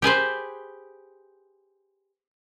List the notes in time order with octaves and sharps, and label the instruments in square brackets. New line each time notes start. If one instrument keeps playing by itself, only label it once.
[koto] G4 G#4 B4 C5